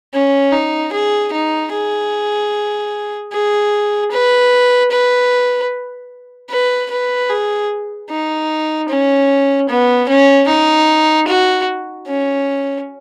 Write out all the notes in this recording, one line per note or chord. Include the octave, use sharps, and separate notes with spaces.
C#4
D#4
G#4
D#4
G#4
G#4
B4
B4
B4
B4
G#4
D#4
C#4
B3
C#4
D#4
F#4
C#4